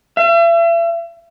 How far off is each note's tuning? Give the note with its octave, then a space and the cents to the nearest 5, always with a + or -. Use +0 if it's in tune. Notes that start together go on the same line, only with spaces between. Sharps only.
E5 +40